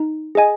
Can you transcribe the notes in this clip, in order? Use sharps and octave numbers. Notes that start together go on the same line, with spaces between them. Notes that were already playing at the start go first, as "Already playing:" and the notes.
Already playing: D#4
G#4 D#5 G#5